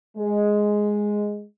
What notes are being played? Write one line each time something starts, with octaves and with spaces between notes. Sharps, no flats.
G#3